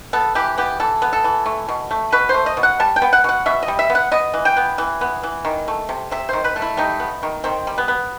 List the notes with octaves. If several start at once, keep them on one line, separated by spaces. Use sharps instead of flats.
B3 A4
E3 G4
B3 G4
E3 A4
B3
A4
E3
A3
B2
A3
B2 B4
C5
A3
D#5
B2
F#5
G3 A5
G5
B3
F#5
B2 F#5
B2 E5
D#5
G3
E5
B3
F#5
B3 D#5
E3
G5
B3
E3
B3
E3
D#3
A3
C3
C3 E5
D#3 C5
B4
A3
E4
G3 D#4
B3
D#3
D#3 C4
G3
B3
B3